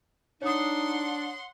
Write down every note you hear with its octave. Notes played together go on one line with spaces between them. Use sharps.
D4 D#4 C#5 F#5 C6 D#6